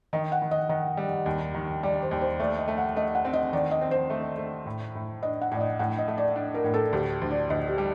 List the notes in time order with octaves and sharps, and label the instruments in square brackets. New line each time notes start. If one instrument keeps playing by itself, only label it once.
[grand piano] D#3 [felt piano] D#5
[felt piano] F#5
[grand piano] D#3
[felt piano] D#5
[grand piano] D#3 [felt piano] D#5
[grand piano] G3
D#2
D#3
[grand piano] G3 [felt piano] D5
[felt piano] C5
[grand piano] D#2
[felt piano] C5
[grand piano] A3 [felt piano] D5
[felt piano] D#5
[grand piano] A3
[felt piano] F#5
[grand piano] A3 [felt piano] D#5
[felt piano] F#5
[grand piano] C4
[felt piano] D#5
[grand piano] D#3 [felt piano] D5
[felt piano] D#5
[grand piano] C4
[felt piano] C5
[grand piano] A3
A3
A2
A2
[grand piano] D4 [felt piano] D#5
[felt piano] F#5
[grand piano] A2 [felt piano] D5
[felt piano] D#5
[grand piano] A2 [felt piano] F#5
[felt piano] D#5
[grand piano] A3
[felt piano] D5
[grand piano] D4
[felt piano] A#4
[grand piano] A2
[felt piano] A4
[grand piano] D2 [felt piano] G4
[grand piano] D2
[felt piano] D5
[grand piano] D2 [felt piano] D#5
[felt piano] G4
[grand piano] G3